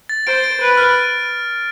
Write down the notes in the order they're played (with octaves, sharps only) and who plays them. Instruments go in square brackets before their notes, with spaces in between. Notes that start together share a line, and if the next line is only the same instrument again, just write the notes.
[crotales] A6
[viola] C5 [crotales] D7
[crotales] D7
[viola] B4 [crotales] D7
[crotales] F6